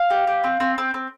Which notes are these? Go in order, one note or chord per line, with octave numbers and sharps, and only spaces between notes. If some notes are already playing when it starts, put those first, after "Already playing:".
Already playing: F5
G4
G4
C4
C4
C4
C4